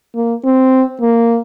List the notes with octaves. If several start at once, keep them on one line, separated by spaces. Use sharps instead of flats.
A#3
C4
A#3